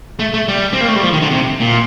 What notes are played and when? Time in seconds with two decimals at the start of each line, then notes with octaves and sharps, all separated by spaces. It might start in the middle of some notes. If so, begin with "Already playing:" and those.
0.19 A3
0.34 A3
0.48 G3
0.73 C4
0.81 A#3
0.88 A3
0.96 G3
1.03 F3
1.13 D#3
1.22 D3
1.31 C3
1.60 A#2